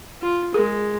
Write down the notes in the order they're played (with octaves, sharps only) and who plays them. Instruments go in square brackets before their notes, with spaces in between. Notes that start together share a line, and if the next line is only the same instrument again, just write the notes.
[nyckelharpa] F4
[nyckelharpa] G#3 [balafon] G#4 A#4